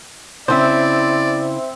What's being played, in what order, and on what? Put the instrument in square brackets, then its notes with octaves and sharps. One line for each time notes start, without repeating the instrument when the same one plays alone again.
[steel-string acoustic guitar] C#3 E4 [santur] C4 D#6 [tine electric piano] C5 E5 [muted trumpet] D5